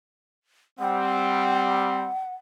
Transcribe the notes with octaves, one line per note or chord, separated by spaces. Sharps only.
G3 C4 F#5